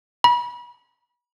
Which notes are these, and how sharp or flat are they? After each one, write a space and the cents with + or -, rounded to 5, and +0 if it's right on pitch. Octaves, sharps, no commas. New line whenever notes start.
B5 -35